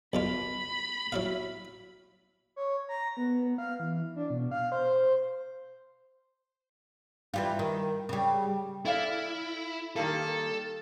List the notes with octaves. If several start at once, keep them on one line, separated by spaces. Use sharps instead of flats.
B1 B2 F4 B5
F#3 E4 F5
C#5
A#5
B3
F5
E3
D4
B2
F5
C5
E3 G3 F4
D#3
C#3 G3
E4 A4 D5 F5
D#3 G3 A#3 A4